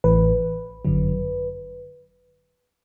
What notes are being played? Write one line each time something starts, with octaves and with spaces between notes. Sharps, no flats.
A1 A2 E3 B4
G1 F#2 D3 F#3